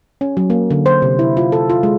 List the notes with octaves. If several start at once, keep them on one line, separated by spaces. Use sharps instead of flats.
C#4
F#3
A#3
D3
C5
C3
E4
F4
A4
F4
G#3